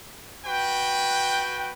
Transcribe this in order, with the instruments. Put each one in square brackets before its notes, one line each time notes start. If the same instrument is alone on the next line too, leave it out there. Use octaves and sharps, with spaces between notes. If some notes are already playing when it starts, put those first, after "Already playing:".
[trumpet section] F#4 B4 G5